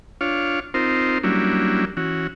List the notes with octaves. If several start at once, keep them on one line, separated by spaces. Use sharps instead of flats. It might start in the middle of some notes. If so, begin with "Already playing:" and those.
D4 F4 C#5 F5
C4 D#4 F4 A#4 C5
F#3 G3 A#3 C#4 D4 E4
E3 C#4 F#4